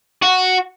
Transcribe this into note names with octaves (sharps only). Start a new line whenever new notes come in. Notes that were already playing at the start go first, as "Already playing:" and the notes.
F#4